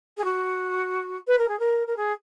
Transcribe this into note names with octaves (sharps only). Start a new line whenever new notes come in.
G#4
F#4
B4
A#4
G#4
A#4
A#4
G#4